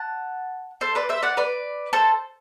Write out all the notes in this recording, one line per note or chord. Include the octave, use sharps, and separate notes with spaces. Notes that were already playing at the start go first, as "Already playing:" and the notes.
Already playing: F#5 A5
A4 C5
B4 D5
C5 E5
D5 F#5
B4 D5
A4 C5